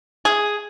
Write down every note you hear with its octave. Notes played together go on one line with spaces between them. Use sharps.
G#4